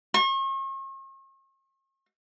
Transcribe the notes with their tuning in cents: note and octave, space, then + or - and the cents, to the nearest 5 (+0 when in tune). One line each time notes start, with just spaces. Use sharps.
C#6 -45